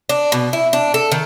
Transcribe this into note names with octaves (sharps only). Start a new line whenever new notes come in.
D4
B2
E4
D4
A4
D#3